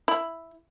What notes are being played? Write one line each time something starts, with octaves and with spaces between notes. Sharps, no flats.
E4